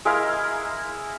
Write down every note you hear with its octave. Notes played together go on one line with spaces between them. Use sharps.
G#3 E4 A#4 F5